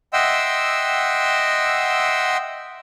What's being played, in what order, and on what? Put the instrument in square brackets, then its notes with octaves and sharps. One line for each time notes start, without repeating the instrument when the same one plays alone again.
[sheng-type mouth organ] D#5 E5 F#5 G5 C6 E6